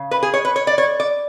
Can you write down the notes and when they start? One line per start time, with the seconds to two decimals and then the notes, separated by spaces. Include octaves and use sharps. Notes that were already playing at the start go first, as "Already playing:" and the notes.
Already playing: C#3
0.11 B4
0.23 G#4
0.34 C#5
0.45 B4
0.56 C#5
0.67 D5
0.78 C#5
1.00 D5